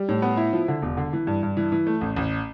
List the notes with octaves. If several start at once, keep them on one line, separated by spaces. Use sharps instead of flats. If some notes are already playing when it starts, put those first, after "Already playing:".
Already playing: G3
A2
B3
E4
F3
D3
E1
D3
E3
G2
G2
E3
E3
A3
A1
A1